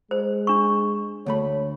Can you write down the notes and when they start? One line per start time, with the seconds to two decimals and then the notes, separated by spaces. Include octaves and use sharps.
0.11 G#3 C5
0.47 D4 C#6
1.26 D2 A3 C#5 B5